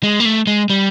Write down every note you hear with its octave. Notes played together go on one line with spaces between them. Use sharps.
G#3
A#3
A3
G#3
G3